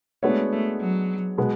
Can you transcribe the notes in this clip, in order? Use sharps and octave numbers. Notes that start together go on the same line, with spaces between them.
G#3 A3 B3 D4 F#4 C#5
A3
F#3
B2 G#3 B3